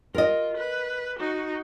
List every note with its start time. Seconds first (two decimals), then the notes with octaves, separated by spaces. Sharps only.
0.15 F4 A#4 D#5
0.58 B4
1.19 D#4 F#4